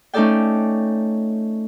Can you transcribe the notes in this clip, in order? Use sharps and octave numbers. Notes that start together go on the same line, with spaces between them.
A3 C#4 D#4 A4 D5 G5